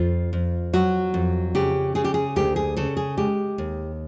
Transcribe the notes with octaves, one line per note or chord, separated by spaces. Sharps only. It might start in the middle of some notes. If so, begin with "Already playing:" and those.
Already playing: F2 F4
F2
F#3 F#4
F2
C#3 G4
C#3 G#4
G4
G#4
D2 G4
G#4
C#3 A4
G#4
G#3 G4
D#2